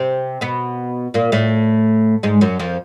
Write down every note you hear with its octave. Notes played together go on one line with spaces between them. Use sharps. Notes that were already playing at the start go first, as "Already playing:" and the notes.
Already playing: C3 C4
B2 B3
A#2 A#3
A2 A3
G#2 G#3
F#2 F#3
F2 F3